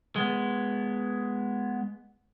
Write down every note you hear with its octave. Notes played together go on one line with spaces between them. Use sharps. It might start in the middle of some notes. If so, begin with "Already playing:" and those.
G#3 B3